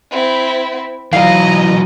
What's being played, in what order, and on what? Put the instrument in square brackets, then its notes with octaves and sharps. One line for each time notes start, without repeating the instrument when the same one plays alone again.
[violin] C4 E4
[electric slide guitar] E3 F#3 [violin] D#5 A#5 [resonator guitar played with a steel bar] F5